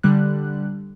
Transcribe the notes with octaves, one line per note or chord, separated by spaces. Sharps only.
D3 G3 F#6